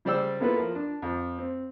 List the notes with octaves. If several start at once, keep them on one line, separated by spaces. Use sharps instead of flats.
C#3 G3 C5 D5 G5 E6
A#3 B3 E4 F4 A4 B4
F3 A#4
D4
F2
C4